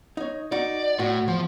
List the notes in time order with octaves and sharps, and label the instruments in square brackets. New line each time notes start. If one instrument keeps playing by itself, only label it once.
[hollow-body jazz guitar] D#4 C#5
[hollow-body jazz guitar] D#4 F#4 [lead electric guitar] D5
[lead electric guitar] A2 [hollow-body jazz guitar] F#4
[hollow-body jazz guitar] E2 [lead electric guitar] F3